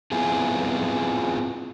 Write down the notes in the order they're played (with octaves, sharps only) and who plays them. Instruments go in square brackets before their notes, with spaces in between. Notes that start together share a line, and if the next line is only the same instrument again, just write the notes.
[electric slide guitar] B3 C4 E4 F4 G#4